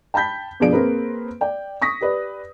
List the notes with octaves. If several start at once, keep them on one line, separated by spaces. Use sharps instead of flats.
G5 A5 B5 G6 B6
G2 B2 F3 G#4 D5 D7
A#3 C4 G#4 A#4 B4
D5 G5
C#6 D#6 A#6 B6
G4 B4 D5